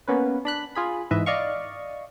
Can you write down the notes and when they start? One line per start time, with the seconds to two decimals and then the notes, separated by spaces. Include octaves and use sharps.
0.08 A#3 B3 C#4 B4
0.45 D4 B5 F#6
0.75 F4 G#4 B5
1.11 G#2 E3 B4 D#5 E5
1.26 D5 D#5 F5 C#6